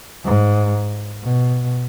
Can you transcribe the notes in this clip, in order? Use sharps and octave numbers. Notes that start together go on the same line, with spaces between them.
G#2
B2